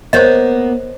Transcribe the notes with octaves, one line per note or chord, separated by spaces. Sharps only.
A#3 B3 C5 C#5 D#5